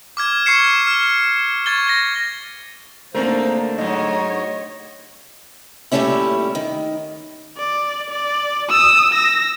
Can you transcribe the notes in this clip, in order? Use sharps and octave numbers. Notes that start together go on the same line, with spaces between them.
D6 F6 G#6
C#6 F6 G#6 C7 C#7 E7
F6
C#6 G#6 A6 G7
A#6
G#2 A3 A#3 C4 D4 A#4 C5
G#2 F#3 C#5 D#5
A#2 F#3 G3 A3 C#4 E4
D#3
D5
D5
D#6 E6
E6 A#6